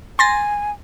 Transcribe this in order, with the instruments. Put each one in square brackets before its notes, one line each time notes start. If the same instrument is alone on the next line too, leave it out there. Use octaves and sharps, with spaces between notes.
[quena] G#5 [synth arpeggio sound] C6 A6 A#6